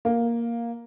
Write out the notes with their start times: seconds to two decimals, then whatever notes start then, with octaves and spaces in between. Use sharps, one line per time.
0.05 A#3